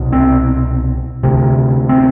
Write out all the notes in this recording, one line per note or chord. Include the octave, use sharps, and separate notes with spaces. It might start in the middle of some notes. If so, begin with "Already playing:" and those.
Already playing: C2 B2
C4
D2 C3
C4